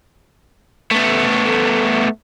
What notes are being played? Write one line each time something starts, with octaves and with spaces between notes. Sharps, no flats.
A3 B3